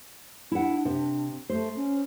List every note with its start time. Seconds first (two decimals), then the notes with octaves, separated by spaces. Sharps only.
0.52 D4 E4 F#5
0.85 C3
1.50 A3 C5
1.76 C#4